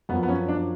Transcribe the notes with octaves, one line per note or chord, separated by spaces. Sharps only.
F#2 F3 B3
B3
C#4
D4